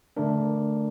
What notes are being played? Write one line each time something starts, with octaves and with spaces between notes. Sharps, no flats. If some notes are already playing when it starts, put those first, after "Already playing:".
D3 A3 D4 A#4